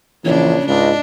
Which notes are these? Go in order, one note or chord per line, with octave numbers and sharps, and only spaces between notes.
A#1 C#3 E3 D4 C#5
C#2 G#2 D4 D#5